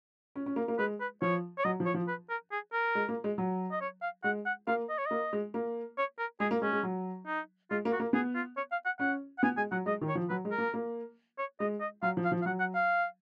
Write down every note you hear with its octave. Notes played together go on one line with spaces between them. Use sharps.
C#4
C#4
A#3
A#3
G#3 B4
B4
F3 C#5
C#5
F#3 D#5
F3
C#5
F3
B4
A#4
G#4
A#4
G#3
A#3
G#3
F#3
D#5
C#5
F5
G#3 F#5
F#5
A#3 F5
D#5
C#5
A#3 D#5
G#3
A#3
C#5
A#4
G#3 G#4
A#3
G#3 C#4
G#3
F#3
D#4
G#3 F4
A#3
F#4
A#3
B3 G#4
F4
C#5
F5
F#5
C#4 F#5
F#5
B3 G#5
G#3 G#5
F#3 F#5
G#3 D#5
D#3
C#5
F3
F#3 B4
G#3
A#4
A#3
A#3
C#5
G#3 D#5
D#5
F#3 F5
F3
F5
F3
F5
F#3 F#5
F#5
F5